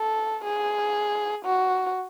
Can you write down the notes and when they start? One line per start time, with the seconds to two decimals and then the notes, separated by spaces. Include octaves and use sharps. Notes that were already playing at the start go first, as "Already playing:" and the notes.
Already playing: A4
0.44 G#4
1.45 F#4